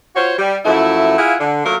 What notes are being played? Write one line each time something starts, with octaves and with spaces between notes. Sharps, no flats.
F4 F#4 C5 C#5
G3
F#2 F3 A3 E4
E4 F4 G#4 F5 F#5
D3
F#3 A3 A#3 F4 A#4